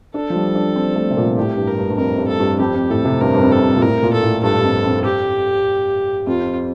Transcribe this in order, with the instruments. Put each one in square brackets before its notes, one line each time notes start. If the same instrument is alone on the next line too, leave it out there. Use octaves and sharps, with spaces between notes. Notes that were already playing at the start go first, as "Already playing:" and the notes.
[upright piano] D4 [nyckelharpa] A4
[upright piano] F3
G3
D4
C4
A3
C3
A#2
[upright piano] A2 [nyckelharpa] G4
[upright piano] G2
[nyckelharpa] A#4
[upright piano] G2
G2
[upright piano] F2 [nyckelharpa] A#4
[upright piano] G2
[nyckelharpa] A4
[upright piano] G2
[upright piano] F2 [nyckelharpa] G4
[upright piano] F2
[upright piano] A2 [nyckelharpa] A4
[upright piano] C3
[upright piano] G2 [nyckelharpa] A#4
[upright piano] G2
F2
[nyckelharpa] A4
[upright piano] G2
A#2
[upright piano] A2 [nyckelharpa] A#4
[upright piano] A#2
[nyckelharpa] A4
[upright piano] A2
[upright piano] G2 [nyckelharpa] A4
[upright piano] G2
F2
F2
[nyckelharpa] G4
[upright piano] F2 [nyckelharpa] F4